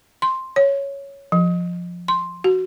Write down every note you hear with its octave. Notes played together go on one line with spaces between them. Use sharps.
C6
C#5
F3
C6
F#4